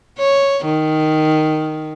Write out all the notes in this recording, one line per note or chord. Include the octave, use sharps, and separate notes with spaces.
C#5
D#3